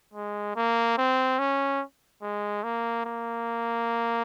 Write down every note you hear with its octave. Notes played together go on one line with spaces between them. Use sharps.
G#3
A#3
C4
C#4
G#3
A#3
A#3